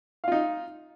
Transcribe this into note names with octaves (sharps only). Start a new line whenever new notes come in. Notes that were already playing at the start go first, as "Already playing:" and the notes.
D#4 F4 F5